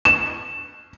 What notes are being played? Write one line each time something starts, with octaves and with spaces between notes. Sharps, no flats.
E7